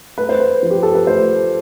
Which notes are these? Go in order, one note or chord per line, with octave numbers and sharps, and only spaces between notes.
A3 B4
C5
B4
F3
G4
A4
B4
A3 C5